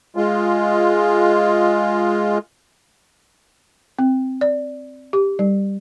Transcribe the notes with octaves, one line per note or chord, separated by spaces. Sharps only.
G#3 F4
C4
D5
G4
G3